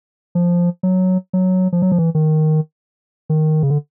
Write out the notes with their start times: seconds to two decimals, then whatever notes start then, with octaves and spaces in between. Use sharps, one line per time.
0.35 F3
0.83 F#3
1.33 F#3
1.72 F3
1.82 F#3
1.92 F3
1.98 E3
2.15 D#3
3.30 D#3
3.63 C#3
3.70 D3